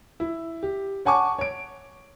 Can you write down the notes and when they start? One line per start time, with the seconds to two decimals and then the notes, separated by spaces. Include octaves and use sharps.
0.20 E4
0.63 G4
1.05 C#5 F#5 G#5 A5 C#6 D6
1.39 C#5 D7